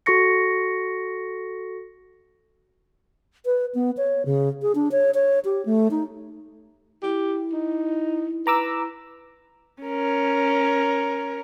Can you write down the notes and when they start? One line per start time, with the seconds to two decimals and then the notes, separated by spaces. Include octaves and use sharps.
0.06 F#4 A4 C#6 A#6 C#7
3.45 B4
3.75 B3
3.97 C#5
4.26 C#3
4.62 G#4
4.75 D4
4.92 C#5
5.14 C#5
5.45 G4
5.66 A3
5.91 D#4
7.03 E4 G4
7.52 D#4
8.47 B4 A#5 D6 E6
9.83 C#4 A#4